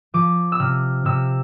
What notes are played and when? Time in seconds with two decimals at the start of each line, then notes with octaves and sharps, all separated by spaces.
0.14 F3 D6
0.52 E6
0.59 C3 F6
1.05 C3 E6